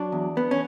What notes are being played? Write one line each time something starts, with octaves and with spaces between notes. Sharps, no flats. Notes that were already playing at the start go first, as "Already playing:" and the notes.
Already playing: F#3 D4
E2
B3
C#4